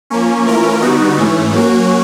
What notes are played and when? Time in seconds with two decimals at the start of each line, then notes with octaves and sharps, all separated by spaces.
0.10 F3 A#3 C#4
0.46 E3 A3 C#4 F4 A#4
0.82 D3 G3 B3 D#4 F#4
1.17 G#2 E3 A3 C#4
1.53 F#3 A#3 C#4 F#4